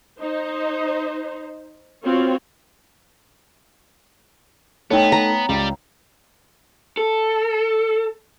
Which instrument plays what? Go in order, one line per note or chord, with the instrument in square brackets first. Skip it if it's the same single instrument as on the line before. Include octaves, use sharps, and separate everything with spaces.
[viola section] D#4 C5
B3 C4 F4 F#4 C#5
[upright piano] A3 D#4 [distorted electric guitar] B3 [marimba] C#5 G5
[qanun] A#5
[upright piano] C#2 [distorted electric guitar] G3 G4
[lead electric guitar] A4